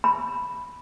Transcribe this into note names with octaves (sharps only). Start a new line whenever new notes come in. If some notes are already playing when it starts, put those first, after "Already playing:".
B5